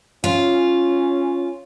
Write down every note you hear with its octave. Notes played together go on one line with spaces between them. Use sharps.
C#4 F4